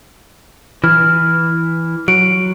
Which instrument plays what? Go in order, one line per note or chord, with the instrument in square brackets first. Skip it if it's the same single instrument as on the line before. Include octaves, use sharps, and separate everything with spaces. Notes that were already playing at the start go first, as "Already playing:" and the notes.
[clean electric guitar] E3 [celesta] F6
[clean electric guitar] F#3 [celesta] D7